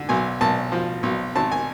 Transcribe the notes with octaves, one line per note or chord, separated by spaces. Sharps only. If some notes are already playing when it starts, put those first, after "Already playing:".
Already playing: D3
B1 G#5
B1 A5
F3
B1
G#1 A5
G#5